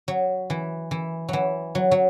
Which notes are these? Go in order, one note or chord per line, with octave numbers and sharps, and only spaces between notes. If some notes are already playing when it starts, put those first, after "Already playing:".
F#3
E3
E3
E3 F#3
F#3
F#3